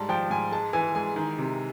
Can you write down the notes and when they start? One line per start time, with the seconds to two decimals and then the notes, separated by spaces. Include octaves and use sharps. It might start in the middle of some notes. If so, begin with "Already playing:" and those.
Already playing: G#2 G3 A5
0.09 F3 G5
0.30 G#2 G#5
0.51 G#3 A5
0.73 E3 G#5
0.95 G#3 G#5
1.16 D#3
1.38 C3